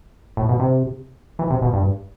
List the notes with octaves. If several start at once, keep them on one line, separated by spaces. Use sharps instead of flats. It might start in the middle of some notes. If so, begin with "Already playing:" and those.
A2
B2
C3
E3
C3
B2
G2